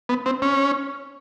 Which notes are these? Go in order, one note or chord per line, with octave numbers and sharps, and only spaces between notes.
B3
C4
C#4